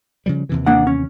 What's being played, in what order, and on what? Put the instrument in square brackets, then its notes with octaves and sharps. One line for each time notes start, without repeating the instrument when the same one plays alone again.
[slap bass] C#3 F3 G3
D#2 C3 E3
[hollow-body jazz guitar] A#3 D4 F#5
C#4